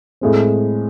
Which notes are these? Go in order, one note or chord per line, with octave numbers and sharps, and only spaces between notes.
A2 G#3 C4